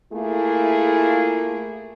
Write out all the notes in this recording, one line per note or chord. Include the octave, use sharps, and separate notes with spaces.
A3 A#3 E4 F4 G#4